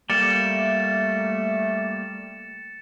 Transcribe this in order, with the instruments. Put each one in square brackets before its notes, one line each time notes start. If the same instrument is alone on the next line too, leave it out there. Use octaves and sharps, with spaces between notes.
[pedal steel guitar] G3 A#3 [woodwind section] A3 [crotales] A6 C#7 E7